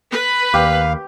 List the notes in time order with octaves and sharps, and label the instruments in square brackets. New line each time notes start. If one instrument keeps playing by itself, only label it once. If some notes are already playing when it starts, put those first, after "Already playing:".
[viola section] B4
[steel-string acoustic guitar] D#2 [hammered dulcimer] G4 [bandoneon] F5